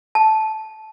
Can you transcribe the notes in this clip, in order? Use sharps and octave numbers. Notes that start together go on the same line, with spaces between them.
A5